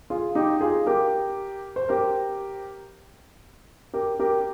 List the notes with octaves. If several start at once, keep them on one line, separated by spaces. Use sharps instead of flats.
F4 G#4
D#4 G4
F4 G#4
G4 A#4
C5
G4 A#4
G4 A#4
G4 A#4